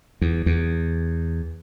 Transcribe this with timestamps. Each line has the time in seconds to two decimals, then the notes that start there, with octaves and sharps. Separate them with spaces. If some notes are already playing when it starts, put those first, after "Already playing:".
0.21 E2
0.46 E2